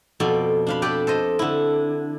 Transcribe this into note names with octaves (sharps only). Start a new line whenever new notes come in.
F2 B2 A4 D5
D4 F5 B5
G4 A4 B4 D5 G5
A4 C5 D#5
D3 E4